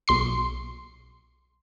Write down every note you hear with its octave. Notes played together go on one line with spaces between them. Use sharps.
B1 C6 C7